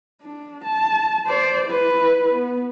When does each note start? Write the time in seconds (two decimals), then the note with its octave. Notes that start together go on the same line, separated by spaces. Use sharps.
0.22 D4
0.64 A5
1.26 C5 D5
1.66 E4 B4
2.33 B3